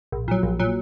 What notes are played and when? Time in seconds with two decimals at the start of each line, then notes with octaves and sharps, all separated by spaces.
0.12 A#1
0.28 A#2 F#3
0.43 A#1
0.59 A#2 F#3